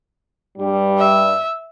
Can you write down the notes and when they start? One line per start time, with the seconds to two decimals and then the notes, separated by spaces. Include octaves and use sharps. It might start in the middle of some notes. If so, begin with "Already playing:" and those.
0.58 G2 G3
0.99 E5